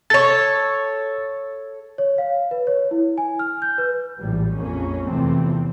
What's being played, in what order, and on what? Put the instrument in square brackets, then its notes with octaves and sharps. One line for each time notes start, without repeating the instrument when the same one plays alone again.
[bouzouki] A4 C#5 [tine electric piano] A6
[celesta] C#5
F5
B4
C#5
E4
G#5
F6
G6
B4
[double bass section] A#1 A2 E3 G3
A#1 F2 A#3 C#4
E2 C3 E3 F3 A3 C4